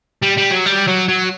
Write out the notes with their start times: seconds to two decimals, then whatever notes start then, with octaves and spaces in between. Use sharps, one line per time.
0.22 G3
0.37 G3
0.51 F#3
0.66 G3
0.87 F#3
1.08 F#3